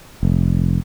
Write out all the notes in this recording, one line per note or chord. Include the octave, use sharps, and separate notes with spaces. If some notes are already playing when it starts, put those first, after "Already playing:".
F1